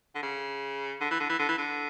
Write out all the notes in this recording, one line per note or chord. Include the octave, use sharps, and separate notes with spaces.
D3
C#3
D3
E3
D3
E3
D3
E3
D3